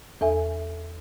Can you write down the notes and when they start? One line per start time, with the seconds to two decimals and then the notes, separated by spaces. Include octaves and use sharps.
0.21 E2 A4 E5 G#5